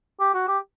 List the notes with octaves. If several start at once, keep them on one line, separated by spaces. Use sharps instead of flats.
G4
F#4
G4